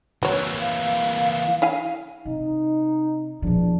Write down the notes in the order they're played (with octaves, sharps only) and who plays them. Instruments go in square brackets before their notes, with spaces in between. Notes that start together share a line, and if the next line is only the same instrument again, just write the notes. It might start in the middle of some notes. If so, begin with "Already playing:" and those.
[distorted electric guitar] E3 A#3 [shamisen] F#4 C#5
[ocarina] F5
[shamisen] E4 F5 G#5
[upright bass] C3 [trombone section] D#4
[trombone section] E2 D4 [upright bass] A#2 F3